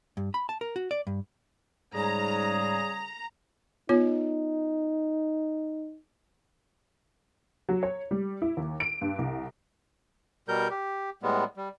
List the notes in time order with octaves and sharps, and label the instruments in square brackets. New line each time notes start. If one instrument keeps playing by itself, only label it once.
[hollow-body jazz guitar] G2
B5
A5
A#4
F#4
D5
G2
[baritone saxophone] G#2 [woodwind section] C#3 G3 G#4 [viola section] A#5
[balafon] B3 F4 C#5 [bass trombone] D#4
[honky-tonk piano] F#3
C#5
G3
E4
D#2
D7
G2
C2
[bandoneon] B2 G3 A#4 G6
G4
A2 G3 G#3 B3
G3